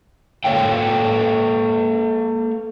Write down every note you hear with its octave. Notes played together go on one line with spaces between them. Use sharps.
A#3 A4 C#5 F5 G5